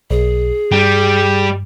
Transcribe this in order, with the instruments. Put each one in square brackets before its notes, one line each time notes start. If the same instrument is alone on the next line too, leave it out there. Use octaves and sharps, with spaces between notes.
[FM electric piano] B1 [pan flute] G#4
[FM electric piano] G2 [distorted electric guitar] G3